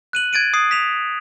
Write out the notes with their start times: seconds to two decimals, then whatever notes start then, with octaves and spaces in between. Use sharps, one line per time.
0.13 F#6 D#7 F#7
0.33 G#6 A6 D7 D#7
0.53 D#6 C7
0.71 B6 E7 F7